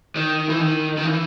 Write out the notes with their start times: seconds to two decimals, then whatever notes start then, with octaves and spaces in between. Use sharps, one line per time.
0.16 D#3
0.49 E3
0.59 D#3
0.97 D#3
1.05 E3